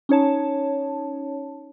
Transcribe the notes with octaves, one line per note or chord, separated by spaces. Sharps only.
C#4 D#4 C#5 A5